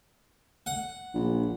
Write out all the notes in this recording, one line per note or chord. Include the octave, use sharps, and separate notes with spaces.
F#5
A#1